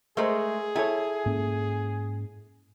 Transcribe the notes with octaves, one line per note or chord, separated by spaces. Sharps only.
G#3 A3 G#4 A#4 C5
E4 A4 C#5 G#5
G#2 A#3 C#4